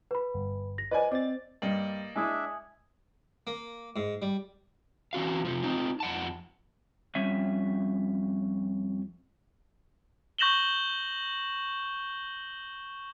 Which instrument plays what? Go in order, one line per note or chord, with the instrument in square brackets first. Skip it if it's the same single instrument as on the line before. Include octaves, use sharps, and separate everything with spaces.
[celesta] B4 B5
[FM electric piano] G1
[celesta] A#6
[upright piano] B4 D5 G#5 [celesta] C5 D#5
[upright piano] C4 [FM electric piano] D5 A6
[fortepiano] G2 [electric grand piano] A#3 D5 D#5 [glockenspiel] C#7 F#7
[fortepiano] G#3 E4 [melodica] D4 E5 [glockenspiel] G#5 D#6 G#6
[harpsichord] A#3
G#2
G3
[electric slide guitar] E3 C#4 F#4 F5
C3 F3
C4 D#4 F4
F2 F#5 A5
F2 G3 C#4 E5
[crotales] C#6 G6 A#6 E7 F#7 G7